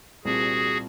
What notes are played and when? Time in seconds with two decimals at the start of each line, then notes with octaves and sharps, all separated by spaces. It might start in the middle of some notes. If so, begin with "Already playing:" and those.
0.25 C2 A#2 G3 C4 F#4 G#4